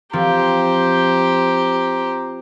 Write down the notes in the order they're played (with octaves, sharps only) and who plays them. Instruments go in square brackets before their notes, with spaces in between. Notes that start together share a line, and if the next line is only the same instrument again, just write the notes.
[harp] F3 C4 [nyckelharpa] G4 C5 [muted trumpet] A#5